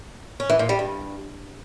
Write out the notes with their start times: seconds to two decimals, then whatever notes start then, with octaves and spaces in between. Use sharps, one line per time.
0.40 C#4
0.50 E3
0.59 A#2
0.69 G3
0.79 G2